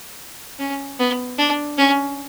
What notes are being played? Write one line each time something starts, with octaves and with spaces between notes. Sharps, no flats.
C#4
B3
D4
C#4